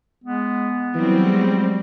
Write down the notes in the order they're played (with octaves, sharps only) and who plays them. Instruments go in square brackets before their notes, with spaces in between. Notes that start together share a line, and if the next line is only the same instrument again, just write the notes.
[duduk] G#3 [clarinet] B3
[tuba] E3 [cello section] F#3 C4 [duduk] G3
[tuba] G#3